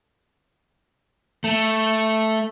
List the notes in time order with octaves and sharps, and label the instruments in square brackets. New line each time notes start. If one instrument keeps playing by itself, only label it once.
[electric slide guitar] A3